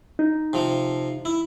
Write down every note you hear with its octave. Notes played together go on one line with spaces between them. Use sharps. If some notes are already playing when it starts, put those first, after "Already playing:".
D#4
C3 F3
E4